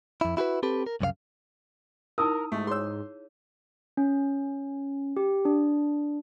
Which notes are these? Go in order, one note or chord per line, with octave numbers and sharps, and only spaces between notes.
F2 E4
E4 F#4 G4 B4
C4 G4 A4 B4
A#4
C2 F#2 C#3 C#5 F5
D#4 E4 A#4 D#6 E6
G#2 A3
G#4 C#5 C6 E6
C#4
G4
D4